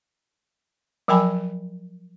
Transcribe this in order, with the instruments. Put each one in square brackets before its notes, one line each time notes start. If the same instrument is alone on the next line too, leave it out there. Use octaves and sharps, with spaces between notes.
[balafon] F3 F#3 A#4 G5 G#5 B5